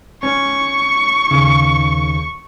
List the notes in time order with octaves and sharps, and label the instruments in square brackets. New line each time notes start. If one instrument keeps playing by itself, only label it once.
[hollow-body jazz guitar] C#4 [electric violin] C#6
[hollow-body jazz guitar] D#2 C#3